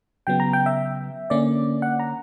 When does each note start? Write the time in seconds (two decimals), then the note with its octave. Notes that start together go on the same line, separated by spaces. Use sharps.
0.27 C#3 F#3 B3 G5
0.40 A#5
0.53 G5
0.66 E5
1.30 D3 A#3 C#4 D5
1.82 F#5
2.00 A#5